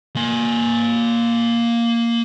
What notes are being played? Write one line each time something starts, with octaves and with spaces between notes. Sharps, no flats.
A#3 G#5